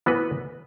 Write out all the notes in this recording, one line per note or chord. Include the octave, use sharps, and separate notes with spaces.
E3 B3 F#4 B4